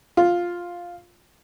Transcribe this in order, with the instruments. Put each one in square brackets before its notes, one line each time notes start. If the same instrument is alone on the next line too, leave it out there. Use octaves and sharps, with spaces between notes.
[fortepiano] F4